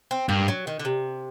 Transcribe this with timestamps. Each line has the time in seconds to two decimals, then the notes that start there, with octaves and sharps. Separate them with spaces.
0.11 C4
0.29 G2 A#3
0.48 F#3
0.67 D#3
0.79 D3
0.85 C3